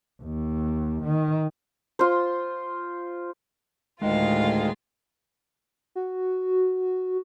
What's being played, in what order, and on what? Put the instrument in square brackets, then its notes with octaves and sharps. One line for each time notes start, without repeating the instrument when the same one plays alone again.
[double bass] D#2
D#3
[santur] F4 C5
[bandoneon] D2 D#3 [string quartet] A2 F4 F5 [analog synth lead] G#3
[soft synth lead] F#4